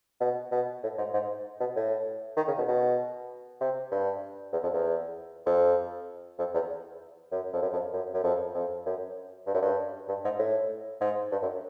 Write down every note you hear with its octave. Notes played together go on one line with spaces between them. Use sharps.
B2
B2
A2
G#2
G#2
B2
A2
D#3
C#3
B2
B2
C3
G2
E2
F2
E2
F2
F2
E2
F#2
F2
F#2
F2
F#2
F#2
F2
F2
F#2
G2
F#2
G2
G2
G#2
A2
G#2
G2
F#2